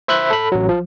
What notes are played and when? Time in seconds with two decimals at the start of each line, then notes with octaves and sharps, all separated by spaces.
0.08 C5 E5 B5 F#6 G6
0.31 A4 B5
0.52 A1 F#3
0.69 F3